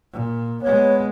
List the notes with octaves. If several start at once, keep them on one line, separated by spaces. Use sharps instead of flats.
A#2
G#3 B3 C#5